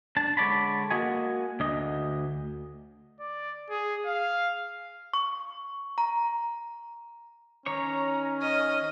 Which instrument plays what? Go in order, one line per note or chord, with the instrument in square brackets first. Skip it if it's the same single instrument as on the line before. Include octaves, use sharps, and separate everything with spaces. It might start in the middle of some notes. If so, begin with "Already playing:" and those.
[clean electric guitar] D4 A5
D3 G#3 C#5 D5 A5 B5
A#3 F#4 D#5 G#5
D2 D4 D#5
[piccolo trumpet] D5
G#4
F5
[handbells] C#6
A#5
[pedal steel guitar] D#3 C#5 C#6 [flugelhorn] C#4 [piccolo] A#5
[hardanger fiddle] D#5 [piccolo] F6